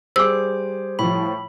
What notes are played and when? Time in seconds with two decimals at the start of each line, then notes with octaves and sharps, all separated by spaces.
0.16 G3 G#4 C5 D6 E6
0.99 A2 F3 B5